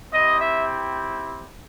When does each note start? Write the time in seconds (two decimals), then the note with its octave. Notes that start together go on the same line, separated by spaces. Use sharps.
0.12 C4 E4 G4 D#5
0.40 E5